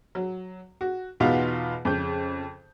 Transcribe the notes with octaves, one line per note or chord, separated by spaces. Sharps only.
F#3
F#4
E2 B2 B3 D#4 F4
F2 C#3 G6